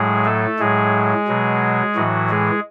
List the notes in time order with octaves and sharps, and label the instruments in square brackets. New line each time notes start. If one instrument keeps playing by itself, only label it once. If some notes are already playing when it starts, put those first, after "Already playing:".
Already playing: [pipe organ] A2 F#3 G#3 G#4
A3 A4
A2 F#3 G#3 G#4
B2 F#3
A2 E3 F#3 F#4
G#3 G#4